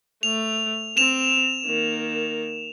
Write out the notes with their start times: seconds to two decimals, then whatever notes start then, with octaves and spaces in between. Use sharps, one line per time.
0.23 A3 F7
0.97 C4 E7 F7
1.65 D#3 A#3